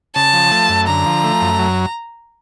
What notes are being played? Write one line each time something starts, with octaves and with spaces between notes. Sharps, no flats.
C#3 A5
F3
A3
F#2
D3 A#5
F3
A3
F#2
F#3